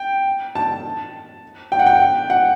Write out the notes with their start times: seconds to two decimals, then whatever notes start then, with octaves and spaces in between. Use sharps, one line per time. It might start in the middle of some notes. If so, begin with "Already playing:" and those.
Already playing: G5
0.55 A5
1.72 G5
1.79 F#5
1.86 G5
2.30 F#5